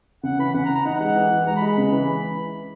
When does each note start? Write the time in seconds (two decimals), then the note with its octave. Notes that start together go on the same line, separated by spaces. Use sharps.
0.23 C#3 F#5
0.39 E3 B5
0.54 C#3 F#5
0.65 A#5
0.70 E3
0.75 A#5
0.85 D#4 F#5
1.00 G#3 F#5
1.16 E3
1.31 E3
1.46 G#3 A#5
1.56 B5
1.62 G#3
1.67 B5
1.78 C#3
1.92 E3